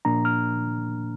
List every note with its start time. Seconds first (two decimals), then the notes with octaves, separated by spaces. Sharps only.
0.05 A#2 F3 A#3 D4 A#5
0.25 F6